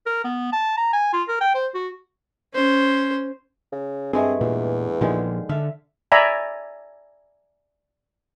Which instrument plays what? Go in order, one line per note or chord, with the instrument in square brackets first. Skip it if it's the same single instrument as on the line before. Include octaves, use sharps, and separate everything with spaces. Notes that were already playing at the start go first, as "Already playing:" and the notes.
[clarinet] A#4
B3
A5
A#5
G#5
F4
A#4
G5
C5
F#4
[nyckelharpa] C#4 C5
[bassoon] C#3
[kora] G2 G#3 A3 [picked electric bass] C4 [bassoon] G#4
[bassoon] E2 [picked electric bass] A#2
[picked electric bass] A#2 F3 [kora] D3 D#3 G#3
[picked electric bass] D3 [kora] A4 E5 F5
[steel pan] D5 E5 G#5 A#5 B5